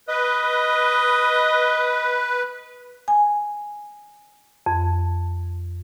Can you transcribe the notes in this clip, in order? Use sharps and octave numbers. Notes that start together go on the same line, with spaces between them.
B4 D#5
G#5
F2